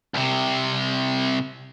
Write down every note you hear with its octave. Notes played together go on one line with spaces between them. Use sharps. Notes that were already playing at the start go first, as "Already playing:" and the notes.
C2 C3